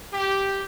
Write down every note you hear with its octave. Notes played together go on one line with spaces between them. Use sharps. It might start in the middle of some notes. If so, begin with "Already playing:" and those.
G4